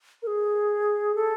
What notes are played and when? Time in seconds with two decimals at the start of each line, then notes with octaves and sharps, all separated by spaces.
0.22 A#4
0.27 G#4
1.15 A4